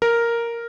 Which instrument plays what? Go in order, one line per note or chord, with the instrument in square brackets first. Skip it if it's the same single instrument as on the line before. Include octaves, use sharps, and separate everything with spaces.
[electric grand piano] A#4